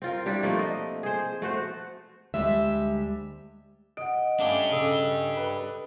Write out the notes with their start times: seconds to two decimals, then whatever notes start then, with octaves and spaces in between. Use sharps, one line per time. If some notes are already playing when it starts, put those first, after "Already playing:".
0.02 C4 F4 A#4
0.26 G3 D4 E4 G4
0.43 F3 A3 A#3 C4
0.59 D#5
1.03 G#4 C5
1.42 A3 F#4 C5
2.34 D2 G3 G#3 E5
3.97 D#5 F#5 D#6 D7
4.40 A3 C#4 D4 G4 F5 A5 D6 D7
4.71 C#3 A4 D#6 E6
5.37 B4